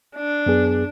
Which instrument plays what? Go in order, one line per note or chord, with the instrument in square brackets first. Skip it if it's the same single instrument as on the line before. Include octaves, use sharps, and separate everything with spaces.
[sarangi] D4
[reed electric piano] F#2 B3 G#4